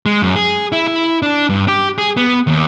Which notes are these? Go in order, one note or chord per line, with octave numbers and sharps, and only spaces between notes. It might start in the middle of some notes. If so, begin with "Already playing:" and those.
G#3
F#2
G#4
E4
E4
D4
G2
G4
G#4
B3
D#2